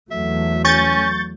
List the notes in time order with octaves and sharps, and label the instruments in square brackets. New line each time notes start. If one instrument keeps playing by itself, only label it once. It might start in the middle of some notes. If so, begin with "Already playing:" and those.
[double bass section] E2 F#3 A3 [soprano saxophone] E5
[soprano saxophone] C#4 [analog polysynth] C#6 G6 A6